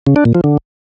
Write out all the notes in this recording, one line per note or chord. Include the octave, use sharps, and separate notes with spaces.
C#3
D4
A#2
F3
D3